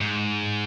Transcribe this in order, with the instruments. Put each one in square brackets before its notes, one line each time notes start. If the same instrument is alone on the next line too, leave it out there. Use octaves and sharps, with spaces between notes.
[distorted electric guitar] G#2